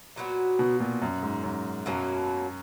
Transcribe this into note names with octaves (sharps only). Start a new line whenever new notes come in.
A#2 F#3 B3 F#4
B2
A#2
F#2
G#2
F#2
F#2 B2 F#3 A#3 C#4